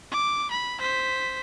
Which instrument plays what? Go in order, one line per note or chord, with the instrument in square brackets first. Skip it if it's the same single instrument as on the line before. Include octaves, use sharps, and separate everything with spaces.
[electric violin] D6
B5
C5 B6